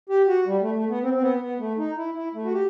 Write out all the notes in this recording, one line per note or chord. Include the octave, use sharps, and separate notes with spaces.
G4
F#4
G3
A3
A3
B3
C4
C4
B3
B3
A3
D#4
E4
E4
A3
F#4
G4